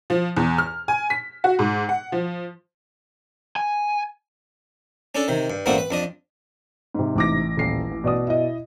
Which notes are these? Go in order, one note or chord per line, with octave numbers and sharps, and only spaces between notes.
F3
E2
F6
G#5
B6
F#4
G#2
F#5
F3
G#5
C#4 D4 A4
C3 D#3
G2
A1 G2 A3 A#3 C4 F#4
B4
F2 D4 D#5
G#2 C3
A1 D6 A#6
D#1 C7
E3
B2 D5 D#6
E4 D#5